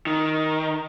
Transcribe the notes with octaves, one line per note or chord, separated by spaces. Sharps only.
D#3